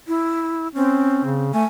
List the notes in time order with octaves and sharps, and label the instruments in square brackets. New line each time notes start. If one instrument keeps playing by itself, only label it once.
[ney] E4
[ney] C4 [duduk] C#4
[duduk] C#3
[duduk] A3 [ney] G#5